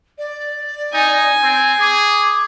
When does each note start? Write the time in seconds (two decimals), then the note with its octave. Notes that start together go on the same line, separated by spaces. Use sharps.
0.18 D5
0.94 D#4 G#5
1.43 C4 G#6
1.80 G#4 D6